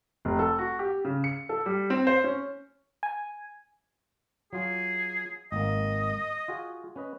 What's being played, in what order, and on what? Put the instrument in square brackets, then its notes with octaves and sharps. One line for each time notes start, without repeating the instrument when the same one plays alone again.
[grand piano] F1
A4
F#4
G4
C#3
C#7
A4
G3
C4
C5
C#4
[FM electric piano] G#5
[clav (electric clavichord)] F#3 F4 G#5 [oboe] G#4
[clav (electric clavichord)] G#1 A#3 [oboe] D#5
[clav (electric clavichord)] F4 F#4 G#4
C#4 B4 D#5